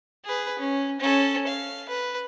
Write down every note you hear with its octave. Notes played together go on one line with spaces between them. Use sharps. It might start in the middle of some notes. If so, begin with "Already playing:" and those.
G#4 B4
C#4
C#4 A4
F5
B4